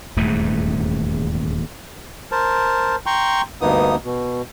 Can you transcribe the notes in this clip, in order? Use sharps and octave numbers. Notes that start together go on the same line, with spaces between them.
D#1 E2 G#2 A3
A#4 C5 A5
G5 A#5 C6 C#6
D2 G2 A#3 B3 D#4 D#6
B2